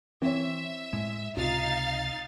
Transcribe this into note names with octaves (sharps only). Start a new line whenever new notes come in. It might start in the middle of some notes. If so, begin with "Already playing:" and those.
E3 C4 C#5 E5
A2 G#3
C#2 C3 D#4 F4 F5 A6